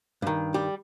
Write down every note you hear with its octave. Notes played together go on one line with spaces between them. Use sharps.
G2 D#3
G3 G4